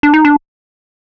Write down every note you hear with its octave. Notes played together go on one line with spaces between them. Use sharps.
D4
D#4
D4